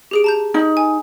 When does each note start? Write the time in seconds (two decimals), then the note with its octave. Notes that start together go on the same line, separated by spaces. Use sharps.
0.11 G4 G#4 D7
0.24 A5 A#5 G6
0.54 D#4
0.77 G#5